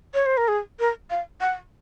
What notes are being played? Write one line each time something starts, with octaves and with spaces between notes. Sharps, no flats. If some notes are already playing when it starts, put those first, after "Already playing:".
C#5
C5
A#4
G#4
A#4
F5
F#5